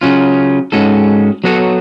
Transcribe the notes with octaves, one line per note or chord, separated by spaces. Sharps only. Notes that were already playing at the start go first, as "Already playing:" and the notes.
C#3 F#3 C#4 F4
G#2 G#3 C#4 F#4 A4
F#3 B3 F#4 A4 C#5